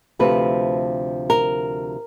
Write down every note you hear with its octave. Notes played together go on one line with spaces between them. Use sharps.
D2 C3 F3 A3 C4 B4
A#4